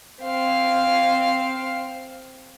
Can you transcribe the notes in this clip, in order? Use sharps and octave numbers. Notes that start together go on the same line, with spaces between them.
C4 F5